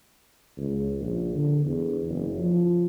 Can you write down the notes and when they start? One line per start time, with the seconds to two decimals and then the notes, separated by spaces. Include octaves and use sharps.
0.57 C#2
1.00 A#1
1.35 D3
1.66 E2
2.09 F#1
2.38 F3